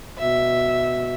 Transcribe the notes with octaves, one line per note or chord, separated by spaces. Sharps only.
B2 E5